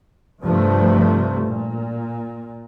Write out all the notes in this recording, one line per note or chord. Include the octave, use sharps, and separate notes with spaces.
G2 C3 F3 A3
A#2